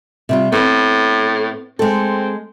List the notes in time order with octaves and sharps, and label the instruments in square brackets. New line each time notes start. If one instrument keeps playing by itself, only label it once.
[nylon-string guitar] C3 G3 F4
[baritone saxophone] A2 [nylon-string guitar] B3 C4
[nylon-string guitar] G#3 A4 [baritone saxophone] C4